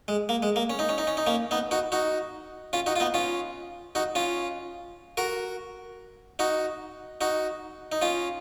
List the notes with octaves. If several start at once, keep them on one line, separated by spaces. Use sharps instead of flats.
G#3
A#3
G#3
A#3
C#4
D#4
C#4
D#4
C#4
D#4
A#3 C#4
B3 D#4
D#4 F#4
D#4 F#4
C#4 F4
D#4 F#4
F4
B3 D#4
C#4 F4
D#4 F#4
C#4 F4
F#4 A#4
D#4 F#4
D#4 F#4
D#4
C#4 F4